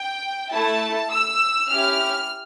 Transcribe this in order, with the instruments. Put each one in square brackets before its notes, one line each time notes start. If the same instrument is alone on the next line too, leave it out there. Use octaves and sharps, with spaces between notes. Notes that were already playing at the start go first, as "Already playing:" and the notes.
Already playing: [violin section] G5
A3 E4 A4 A5
E6
C#4 E4 G4 F6